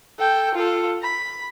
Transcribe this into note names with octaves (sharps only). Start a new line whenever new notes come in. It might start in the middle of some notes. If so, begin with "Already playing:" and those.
A4 G5
F4 A4
B5